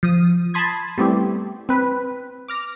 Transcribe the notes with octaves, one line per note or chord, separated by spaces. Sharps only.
F3 D#6
A5 B5 C6 D#6 G#6
G3 A3 B3 C4 E4 G4
C4 B4
D6 F6 A#6